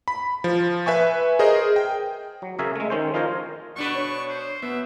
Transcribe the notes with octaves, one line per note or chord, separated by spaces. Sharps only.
B5
F3
B4 E5 G#5 C#6
G#4 A#4 C5 D#5
G5
F#3
C#3 G#4 A#4 C#5 E5
G#3 A3
D#3 C#4 C5
F3 D#4 F4 A#4 C5 C#5
B2 D4 B4 C#6
C#5
C5
B2 B3 E5